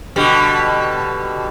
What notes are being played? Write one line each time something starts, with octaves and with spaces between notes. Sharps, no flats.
B2 D3 G3